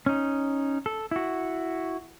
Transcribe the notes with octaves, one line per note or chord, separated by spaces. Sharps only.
C#4 D#4
A4
E4 F#4